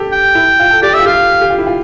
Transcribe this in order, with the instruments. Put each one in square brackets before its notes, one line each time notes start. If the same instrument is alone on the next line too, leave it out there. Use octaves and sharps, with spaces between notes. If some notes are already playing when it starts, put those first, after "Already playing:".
Already playing: [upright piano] G4 A4
[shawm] G5
[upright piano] E4
F4
A4
[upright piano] G4 [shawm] D5
[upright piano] F4 [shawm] E5
[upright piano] G4 [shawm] F5
[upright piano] G4
F4
E4
F4